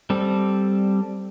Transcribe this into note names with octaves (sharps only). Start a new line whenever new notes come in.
G3 C4 A4